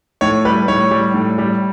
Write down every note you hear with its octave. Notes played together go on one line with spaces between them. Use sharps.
A2 C#5
G3 B4
A2 C#5
G3
A2
G3